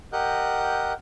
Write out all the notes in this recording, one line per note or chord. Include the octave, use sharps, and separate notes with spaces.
G4 A#4 D#5 F#5 F#6 G6